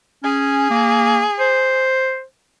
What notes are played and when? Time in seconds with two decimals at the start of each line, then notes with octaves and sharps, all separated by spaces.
0.23 C#4 G#4
0.70 A#3
1.39 C5